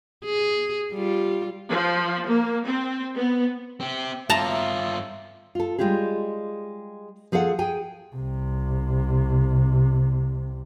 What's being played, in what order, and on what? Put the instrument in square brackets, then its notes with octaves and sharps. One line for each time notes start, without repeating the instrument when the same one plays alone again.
[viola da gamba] G#4
G3 F4
[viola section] F3
A#3
C4
B3
[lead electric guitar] C4 G4
[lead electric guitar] G2 F4 [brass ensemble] E5 [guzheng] A5 A#5
[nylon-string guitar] F4 A4
G3 G#3 F4 G4 G#4
F3 G#4 A4 F5 F#5
G#4 G5 G#5
[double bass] C2 C3